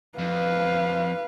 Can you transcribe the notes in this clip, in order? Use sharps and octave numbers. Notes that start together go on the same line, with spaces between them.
F2 B4 F5